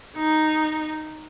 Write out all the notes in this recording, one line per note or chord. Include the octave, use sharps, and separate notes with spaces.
D#4